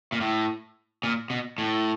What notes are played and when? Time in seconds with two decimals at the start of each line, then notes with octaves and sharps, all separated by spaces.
0.12 A#2
0.21 A2
1.03 A#2
1.30 B2
1.58 A2